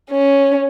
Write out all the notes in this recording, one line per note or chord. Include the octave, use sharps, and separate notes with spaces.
C#4